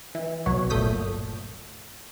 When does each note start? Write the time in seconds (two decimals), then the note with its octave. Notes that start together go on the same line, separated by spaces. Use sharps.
0.15 E3
0.46 C2 B2 F#3 F#4 C#5
0.70 G1 A#2 A3 D#6 G6 B6